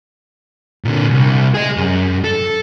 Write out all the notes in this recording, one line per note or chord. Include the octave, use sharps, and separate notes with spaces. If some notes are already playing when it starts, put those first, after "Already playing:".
A#2 D3
C2
G#4 D#5
F#2
A4